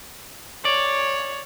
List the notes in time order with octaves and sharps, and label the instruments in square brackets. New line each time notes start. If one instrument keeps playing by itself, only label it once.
[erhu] C#5 [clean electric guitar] D5